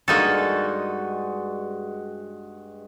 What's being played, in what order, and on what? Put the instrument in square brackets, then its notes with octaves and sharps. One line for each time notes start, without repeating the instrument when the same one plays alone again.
[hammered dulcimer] G2 G#3 F#4 [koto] A#3 D#4 A4